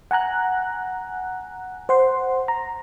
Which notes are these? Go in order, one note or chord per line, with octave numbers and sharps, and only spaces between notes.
F#5 G#5 A#5 F#6
C5 F#5 C6
A#5